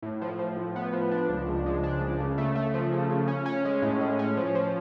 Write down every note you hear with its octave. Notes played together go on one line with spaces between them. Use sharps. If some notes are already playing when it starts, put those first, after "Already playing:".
A2
F3
F3
A2
B3
F3
D4
C#2
C#2
G#3
D4
C#2
C#3
A3
A3
F3
C#3
C#3
C#4
C#4
G#3
A2
G#3
C#4
F3
F3